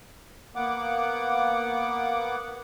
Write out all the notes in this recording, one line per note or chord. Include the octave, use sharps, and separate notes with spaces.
A#3 B3 F#5 D6